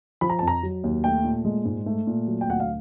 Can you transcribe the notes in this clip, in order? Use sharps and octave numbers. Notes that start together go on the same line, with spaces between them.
F3 B5
A#5
F2 A5
A#5
F#3
D#2
A3 G5
A#2
G#3
G#2
A3
A#2
F#3
G5
D2 F#5
F5